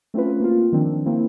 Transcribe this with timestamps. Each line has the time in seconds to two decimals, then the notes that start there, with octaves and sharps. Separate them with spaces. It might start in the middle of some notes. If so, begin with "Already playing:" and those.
0.14 A3 C4 C#4 F4 B4
0.40 A#3 C4 F4
0.72 D#3 F3 C4 D4
1.06 A#3 C4 E4